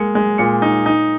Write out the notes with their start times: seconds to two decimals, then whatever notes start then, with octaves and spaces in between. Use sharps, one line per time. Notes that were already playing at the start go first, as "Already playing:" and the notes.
Already playing: G#3 A#3 C#7
0.15 G#3
0.38 A#2 C#7
0.62 D#4
0.86 D#4